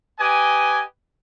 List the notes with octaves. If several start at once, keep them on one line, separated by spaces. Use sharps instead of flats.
G4 B4 D#5 G#5